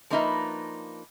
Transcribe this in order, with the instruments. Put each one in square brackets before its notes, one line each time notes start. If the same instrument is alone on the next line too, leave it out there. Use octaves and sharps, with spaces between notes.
[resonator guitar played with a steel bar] F3 A#3 D4 D#4 B4 E5